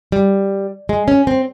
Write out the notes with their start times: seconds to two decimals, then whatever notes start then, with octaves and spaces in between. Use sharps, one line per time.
0.12 G3
0.89 G#3
1.08 C#4
1.27 C4